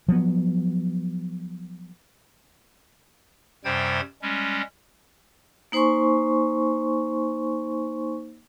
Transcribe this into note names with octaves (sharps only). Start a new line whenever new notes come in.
F3 F#3 B3
F#2 C3 G3 C5 G5 G#6
G3 G#3 C#4
A#3 D#4 C5 G#5 C6 C#6